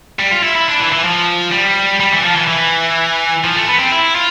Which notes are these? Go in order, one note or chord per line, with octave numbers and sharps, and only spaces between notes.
G3
F4
E4
E4
D4
E3
E3
F3
G3
G3
E3
F3
E3
E3
F3
A3
B3
C4
E4
F4